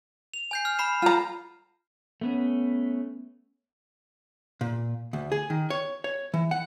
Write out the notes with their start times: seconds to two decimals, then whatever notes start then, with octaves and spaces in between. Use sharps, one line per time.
0.34 F7
0.51 G#5 G6 C7
0.65 F6
0.79 B5 C7 E7
1.02 F4 A#5 F6
2.21 A3 B3 C#4
4.61 A#2
5.13 D2
5.32 G#4
5.50 D#3
5.70 C#5
6.04 C#5
6.34 E3
6.51 F#5